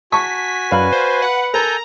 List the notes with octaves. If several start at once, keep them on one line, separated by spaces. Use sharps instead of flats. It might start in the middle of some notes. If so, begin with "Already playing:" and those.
F#4 G#5 A5 C#6 B6
F#2 B4 D5 F5 B5
C5
F#5
A4 A#4 G#5 A#5 G6